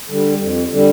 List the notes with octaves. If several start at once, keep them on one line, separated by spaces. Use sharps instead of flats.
D3 G3
F2
D3 G3